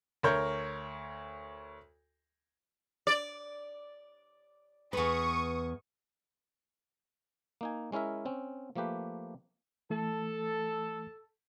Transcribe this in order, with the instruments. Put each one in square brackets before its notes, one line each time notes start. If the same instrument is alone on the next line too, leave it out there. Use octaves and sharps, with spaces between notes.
[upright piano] D2 A#4 C#5 G6
[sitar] D5
[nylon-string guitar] E2 B4 [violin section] C#6 D#6
[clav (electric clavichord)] A#3 D#4 G#5
G#3 C#4 E4 A#4 E5
C4 C#4
F3 A3 A#3 G4 B4
[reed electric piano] E3 A3 [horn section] A4